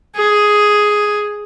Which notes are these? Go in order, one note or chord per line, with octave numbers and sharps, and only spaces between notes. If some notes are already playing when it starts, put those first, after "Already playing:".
G#4